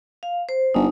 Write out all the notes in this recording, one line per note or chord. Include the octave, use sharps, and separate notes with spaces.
F5
C5
G1 D#4